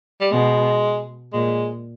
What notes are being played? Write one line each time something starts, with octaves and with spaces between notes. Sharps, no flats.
G3
B2 G#3
A#2 G#3